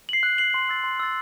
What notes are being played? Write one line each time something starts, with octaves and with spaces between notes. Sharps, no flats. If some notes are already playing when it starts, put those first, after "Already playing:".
C7 F#7
F#6
C7 F#7
C6
E6 A6
C6
E6 A6